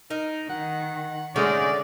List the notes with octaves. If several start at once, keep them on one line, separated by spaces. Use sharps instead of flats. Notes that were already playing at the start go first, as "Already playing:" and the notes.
D#4 A#4
D#3 F#5
D3 F#3 G#3 A3 C#4 D#4 D5